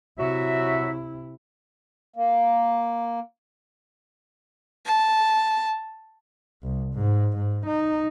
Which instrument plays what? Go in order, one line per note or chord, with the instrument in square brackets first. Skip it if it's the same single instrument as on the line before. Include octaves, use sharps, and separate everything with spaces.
[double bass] C3 E4 [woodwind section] F#3 F#4 E5
[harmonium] A#3
[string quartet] A5
[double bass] C2
G#2
G#2
D#4